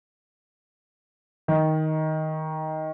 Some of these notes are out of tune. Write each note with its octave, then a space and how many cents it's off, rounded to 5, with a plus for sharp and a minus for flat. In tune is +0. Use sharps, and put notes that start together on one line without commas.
D#3 +10